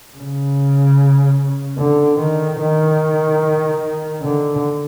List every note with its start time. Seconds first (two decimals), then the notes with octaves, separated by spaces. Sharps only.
0.17 C#3
1.79 D3
2.20 D#3
2.61 D#3
4.22 D3